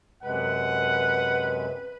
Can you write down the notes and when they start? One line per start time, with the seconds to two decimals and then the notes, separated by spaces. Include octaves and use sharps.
0.23 F#2 C3 G#3 B4 F#5